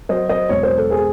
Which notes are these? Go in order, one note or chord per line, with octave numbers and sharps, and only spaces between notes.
F#3 C5 D#5
C5 D#5
E1 C#5
C5
A4
G#4 C5